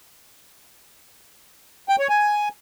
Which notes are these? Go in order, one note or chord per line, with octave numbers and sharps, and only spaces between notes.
G5
C#5
G#5